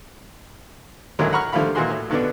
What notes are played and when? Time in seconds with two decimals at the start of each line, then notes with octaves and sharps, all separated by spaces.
1.19 A1 D2 F#3 G#3 A#3
1.33 F#5 A#5 B5 C#6 F6
1.52 D3 F3 G3 A3 F5 B5
1.75 A#2 E3 G#3 F#4 G#4 C6
1.90 A2
2.10 G2 B2 D3 B3 D4